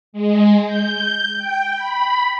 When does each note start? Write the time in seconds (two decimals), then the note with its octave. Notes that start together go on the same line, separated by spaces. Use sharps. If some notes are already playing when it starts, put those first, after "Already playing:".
0.13 G#3
0.66 G6
1.38 G5
1.75 B5